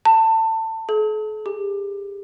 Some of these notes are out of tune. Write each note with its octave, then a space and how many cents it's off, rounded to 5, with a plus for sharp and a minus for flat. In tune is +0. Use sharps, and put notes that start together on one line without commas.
A5 +25
A4 -45
G4 +35